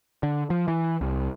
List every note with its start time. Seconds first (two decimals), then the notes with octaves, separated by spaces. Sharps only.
0.23 D3
0.50 F3
0.68 E3
1.01 C2